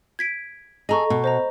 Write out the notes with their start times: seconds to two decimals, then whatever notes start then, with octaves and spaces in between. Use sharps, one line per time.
0.19 G#6 B6 D7
0.89 G#4 A4 D#5 A#5 C#6
1.10 B2
1.24 C5 D#5 A#5